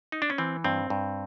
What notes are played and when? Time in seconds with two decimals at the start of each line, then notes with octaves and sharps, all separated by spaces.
0.12 D#4
0.22 D4
0.30 C#4
0.38 E3 C4
0.64 G2 C4
0.90 G2